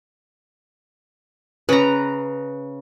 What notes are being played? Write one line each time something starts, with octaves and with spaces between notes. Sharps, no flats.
C#3 B4 A#5